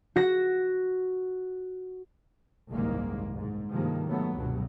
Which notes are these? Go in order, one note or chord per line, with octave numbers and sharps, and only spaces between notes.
F#4 A#6
F#1 C2 G#2 D#3 G#3 A#3
B1 G#2
G2 C3 D#3 F3 G#3 A#3
F#2 F#3 A3 B3
F1 C#2 G2 B2 F#3